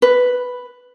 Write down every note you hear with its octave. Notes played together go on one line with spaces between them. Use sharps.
B4